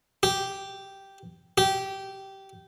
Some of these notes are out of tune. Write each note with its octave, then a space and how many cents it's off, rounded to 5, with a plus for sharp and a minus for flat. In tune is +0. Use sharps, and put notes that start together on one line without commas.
G4 -5
G4 -15